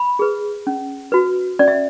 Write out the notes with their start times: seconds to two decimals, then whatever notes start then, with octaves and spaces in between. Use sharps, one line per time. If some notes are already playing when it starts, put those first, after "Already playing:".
Already playing: B5
0.19 G#4 B4
0.67 C#4
1.12 F#4 B4
1.59 C#4 D5
1.68 E5